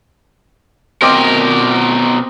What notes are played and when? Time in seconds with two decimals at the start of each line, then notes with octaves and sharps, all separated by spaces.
1.02 B2 C4 A#4 D#5 D6